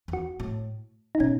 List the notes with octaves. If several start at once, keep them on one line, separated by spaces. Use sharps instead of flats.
E2
F#4
A2
D#4
B2 C#4